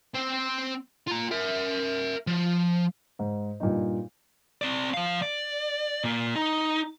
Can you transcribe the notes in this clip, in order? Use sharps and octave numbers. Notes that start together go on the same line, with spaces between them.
C4 C5
F4 A#5
A#4 E5
F3
G#2
G2 A#2 G3 D#4
C4 D5
F3 F5
D5
A#2 A#3
D#4